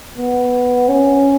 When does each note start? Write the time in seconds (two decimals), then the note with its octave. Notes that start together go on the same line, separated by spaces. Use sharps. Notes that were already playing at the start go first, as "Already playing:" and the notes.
0.18 B3
0.89 C#4